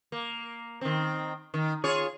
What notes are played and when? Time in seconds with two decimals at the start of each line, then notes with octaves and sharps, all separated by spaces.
0.12 A#3
0.81 D#3 C4
1.54 D#3
1.84 F4 G#4 C#5